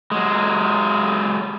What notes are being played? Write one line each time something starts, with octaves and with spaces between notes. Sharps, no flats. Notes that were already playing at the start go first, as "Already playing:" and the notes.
F#3 G#3